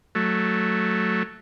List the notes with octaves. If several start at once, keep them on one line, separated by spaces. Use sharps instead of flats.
F#3 A3